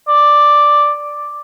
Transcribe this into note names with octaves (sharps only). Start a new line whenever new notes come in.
D5